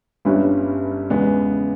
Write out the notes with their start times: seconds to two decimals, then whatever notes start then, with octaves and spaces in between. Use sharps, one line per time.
0.25 G1 G2 G3 C#4 B4
1.10 E2 C#3 G#3 B3 B4